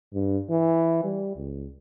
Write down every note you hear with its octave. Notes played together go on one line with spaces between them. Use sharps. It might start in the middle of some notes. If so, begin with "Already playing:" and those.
G2
E3
G3
C#2